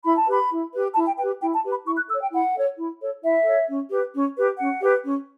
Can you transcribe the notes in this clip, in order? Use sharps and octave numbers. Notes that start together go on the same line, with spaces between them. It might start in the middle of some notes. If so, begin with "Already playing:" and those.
E4 B5
A5
G4 B4 B5
E4
G4 B4
E4 A5
G5
G4 B4 G5
E4 G5
A5
G4 B4
B5
E4 C#6
F#6
A4 C#5 E6
G5
E4 F#5
A4 C#5
E4
A4 C#5
E4 E5
A4 C#5
C#4
G4 B4
C#4
G4 B4
C#4 F#5
G4 B4
C#4